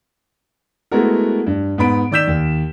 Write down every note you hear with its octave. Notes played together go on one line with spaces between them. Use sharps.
G#3 A3 B3 E4 F#4 A#4
G2
G#2 B3 B5 D7
D#3 D5 E6 G6 B6 E7
D#2